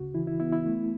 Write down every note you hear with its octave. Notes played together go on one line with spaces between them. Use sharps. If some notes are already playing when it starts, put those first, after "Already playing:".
Already playing: D2 C#3 F#4
E3 E4
E4
B3 E4
E4
A3